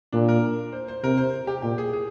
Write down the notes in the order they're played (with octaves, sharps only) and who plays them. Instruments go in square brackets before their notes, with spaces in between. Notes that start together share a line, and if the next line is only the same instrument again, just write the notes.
[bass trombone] A#2 [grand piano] D4
[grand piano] A#4
C5
C5
[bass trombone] C3 [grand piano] A#4
[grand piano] C5
G4
[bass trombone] A#2 [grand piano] G4
[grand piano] G#4
G#4